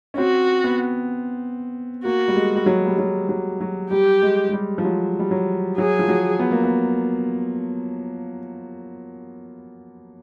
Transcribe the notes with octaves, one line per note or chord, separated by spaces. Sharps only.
C#4
C4 F#4
B3
A#3 F#4
G3
G#3
G3
F#3
G3
F#3
F#3
F#3
G3 G4
G#3
G#3
G3
F3
F#3
G3
F#3
F#3 G#4
F3
F#3
B3
A#3
B3